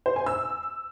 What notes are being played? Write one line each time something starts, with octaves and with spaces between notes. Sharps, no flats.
C5
G#5
E6